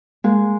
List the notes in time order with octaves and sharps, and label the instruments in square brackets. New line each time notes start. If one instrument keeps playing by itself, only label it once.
[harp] G#3 [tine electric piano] A#3